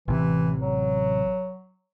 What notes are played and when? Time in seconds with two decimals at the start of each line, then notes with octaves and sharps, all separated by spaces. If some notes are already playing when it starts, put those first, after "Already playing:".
0.08 A1 C3 E3
0.62 F#3